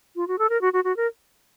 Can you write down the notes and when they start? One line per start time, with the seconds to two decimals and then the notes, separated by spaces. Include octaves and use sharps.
0.16 F4
0.28 F#4
0.39 A4
0.50 A#4
0.61 F#4
0.73 F#4
0.84 F#4
0.97 A#4